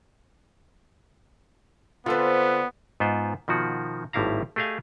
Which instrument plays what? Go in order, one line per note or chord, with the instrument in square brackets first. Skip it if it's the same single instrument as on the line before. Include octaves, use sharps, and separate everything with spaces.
[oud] D3 C4 [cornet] B3 [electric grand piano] F4 A4 B4
[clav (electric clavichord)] G#2 B3 F4 C5
B2 D#3 F3 F#4
G#1 A2 G3 E4 F5 A#5
A3 G4 G#4 D#5 F5 G#5